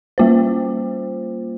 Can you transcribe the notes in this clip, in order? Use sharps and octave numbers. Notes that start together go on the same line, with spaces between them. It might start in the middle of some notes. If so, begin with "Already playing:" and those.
G3 A#3 F4 C5